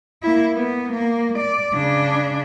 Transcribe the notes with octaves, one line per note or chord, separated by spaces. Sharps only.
A#3 E4
B3
A#3
D5
C#3 D4